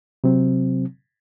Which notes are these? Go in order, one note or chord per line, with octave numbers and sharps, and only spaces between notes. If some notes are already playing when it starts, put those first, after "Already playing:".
C3 F#3 C4